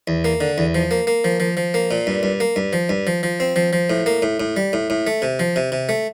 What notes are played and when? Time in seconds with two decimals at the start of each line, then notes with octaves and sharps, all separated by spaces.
0.08 E2
0.25 A#3
0.41 D3
0.58 E2
0.75 F3
0.91 A#3
1.07 A#3
1.24 F3
1.40 F3
1.57 F3
1.74 A#3
1.91 A#2
2.07 G2
2.23 G2
2.40 A#3
2.56 G2
2.73 F3
2.89 G2
3.07 F3
3.23 F3
3.40 C4
3.56 F3
3.73 F3
3.90 A2
4.06 A#3
4.22 A2
4.40 A2
4.57 G3
4.73 A2
4.90 A2
5.07 A3
5.22 C3
5.39 F3
5.56 C3
5.72 C3
5.89 A3